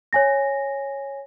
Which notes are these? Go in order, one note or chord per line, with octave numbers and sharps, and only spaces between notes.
C#5 G#5 A#6